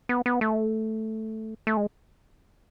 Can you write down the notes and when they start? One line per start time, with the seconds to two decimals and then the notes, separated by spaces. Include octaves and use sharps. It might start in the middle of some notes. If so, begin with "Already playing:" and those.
0.09 B3
0.26 B3
0.41 A3
1.67 A3
1.77 G#3